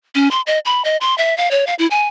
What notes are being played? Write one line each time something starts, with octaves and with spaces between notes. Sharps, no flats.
C#4
C6
D#5
B5
D#5
C6
E5
F5
C#5
F5
E4
G#5